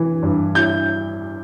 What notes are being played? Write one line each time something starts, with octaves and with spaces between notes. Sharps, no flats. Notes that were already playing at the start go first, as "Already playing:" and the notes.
Already playing: E3 E4
G2
E4 G6